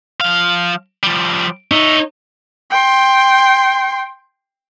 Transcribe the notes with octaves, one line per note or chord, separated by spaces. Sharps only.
F3 F5
F3 G3
D#4 C#5 E5
G5 C6